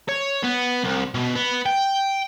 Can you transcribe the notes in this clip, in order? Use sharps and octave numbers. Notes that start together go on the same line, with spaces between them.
C#5
B3
C2
B2
B3
G5